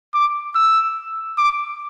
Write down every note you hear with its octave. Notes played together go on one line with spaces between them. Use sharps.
D6
E6
D6